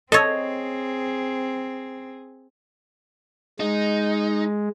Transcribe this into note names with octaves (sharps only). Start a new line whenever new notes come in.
C4 G#4 A4 C#5 D#5
G#3 D#4